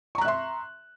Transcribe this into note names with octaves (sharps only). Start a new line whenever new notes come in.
E5 A#5 C6 C#6 F#6